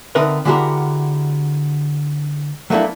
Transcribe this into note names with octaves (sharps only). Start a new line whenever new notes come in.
D3 C4 D#4 A#4 B4 E5
D3 G#3 E4 F#4 G4 A#4
F#3 A3 A#3 D4 E4